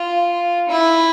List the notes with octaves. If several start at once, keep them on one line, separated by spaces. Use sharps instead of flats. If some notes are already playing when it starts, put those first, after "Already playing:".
Already playing: F4
E4